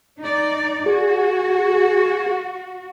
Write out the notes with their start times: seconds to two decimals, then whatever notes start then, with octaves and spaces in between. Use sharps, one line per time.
0.21 D#4 D5
0.86 F#4 G#4